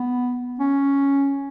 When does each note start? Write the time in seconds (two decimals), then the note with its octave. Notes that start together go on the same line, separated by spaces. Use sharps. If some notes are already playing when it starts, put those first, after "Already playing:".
Already playing: B3
0.60 C#4